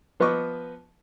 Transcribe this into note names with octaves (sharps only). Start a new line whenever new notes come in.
F3 B3 B4 D#5 C#6 D6